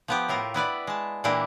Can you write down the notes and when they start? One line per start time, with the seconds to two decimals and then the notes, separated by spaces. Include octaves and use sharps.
0.08 F3 B3 G4
0.28 A2 E4 F4 A#4
0.54 B3 E4 B4 D5
0.87 G#3 A5
1.24 A#2 E3 A#3 D4 E4 G4